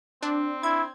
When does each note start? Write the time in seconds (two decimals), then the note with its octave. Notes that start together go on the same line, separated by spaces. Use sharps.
0.23 C4 D4
0.63 E4 G#6